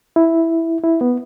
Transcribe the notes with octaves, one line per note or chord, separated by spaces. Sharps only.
E4
E4
B3